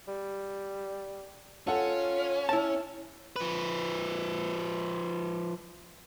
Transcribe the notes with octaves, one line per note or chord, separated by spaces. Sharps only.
G3
C#4 F4 A4 F#5
E4 A5
F3 B4